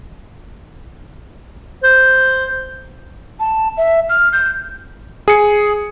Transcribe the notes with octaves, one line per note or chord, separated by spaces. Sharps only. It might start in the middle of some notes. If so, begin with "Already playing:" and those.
C5
A5
E5
F6
G6
G#4 C#7